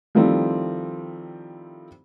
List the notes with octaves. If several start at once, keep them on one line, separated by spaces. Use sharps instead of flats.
D#3 F3 G3 A3 C4 E4